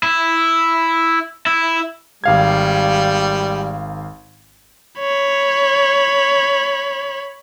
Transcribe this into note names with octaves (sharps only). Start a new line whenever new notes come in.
E4
E4
G#1 G3 F5 G#6
C#5 B5